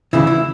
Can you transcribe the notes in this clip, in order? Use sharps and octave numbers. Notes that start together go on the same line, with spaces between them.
D2 C#3 E3 E4
E4